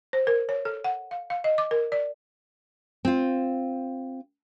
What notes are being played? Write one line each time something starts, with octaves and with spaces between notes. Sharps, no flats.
C5
A#4
C#5
A4
F#5
F5
F5
D#5
D6
A#4
D5
C4 F4